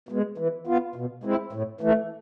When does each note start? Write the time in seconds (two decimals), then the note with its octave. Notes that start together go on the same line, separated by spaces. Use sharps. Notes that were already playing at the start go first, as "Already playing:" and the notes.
0.09 B2 G#3
0.38 E3
0.67 B3 F4
0.96 B2
1.24 G#3 C4 E4
1.53 A2
1.81 E3 A3